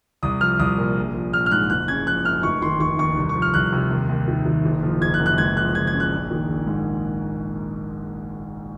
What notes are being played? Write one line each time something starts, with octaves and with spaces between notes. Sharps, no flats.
C2 D#6
F3 F6
C2 D#6
A#2
A#1
F3
A#1 F6
F6
G#2 F#6
F#1 F#6
C#3 G#6
F3 F#6
F#2 F6
F1 C#6
D#3 C6
F1 C#6
D#2 C#6
C2
C#6
F3
F6
C2 F#6
C3
D#2
D#2
D#3
D#3
F#1
F3
F#1 G#6
F#6
F#2
F#6
C#2 G#6
F3 F#6
C#2 G#6
G#6
C#3
F#6
A#1
D#3
A#1
G#2